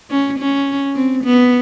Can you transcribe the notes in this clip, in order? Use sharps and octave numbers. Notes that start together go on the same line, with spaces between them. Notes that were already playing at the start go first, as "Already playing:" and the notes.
C#4
C#4
C4
B3